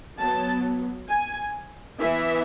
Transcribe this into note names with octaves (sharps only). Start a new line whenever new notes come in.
F#3 B3 A5
G#5
E3 B3 E5